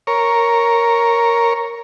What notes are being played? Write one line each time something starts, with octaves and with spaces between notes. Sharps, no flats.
A#4 C#5